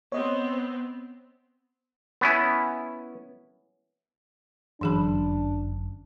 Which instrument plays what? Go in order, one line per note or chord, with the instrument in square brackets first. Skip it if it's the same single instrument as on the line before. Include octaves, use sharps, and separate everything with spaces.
[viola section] B3 C4 [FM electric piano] C#5 D#5
[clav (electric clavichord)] B3 C#4 E4
[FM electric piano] G1 F#2 [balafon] E3 G#4 B5 [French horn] D4